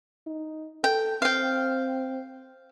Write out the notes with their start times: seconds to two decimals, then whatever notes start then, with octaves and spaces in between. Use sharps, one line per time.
0.26 D#4
0.84 A4 G5
1.22 C4 F5 G5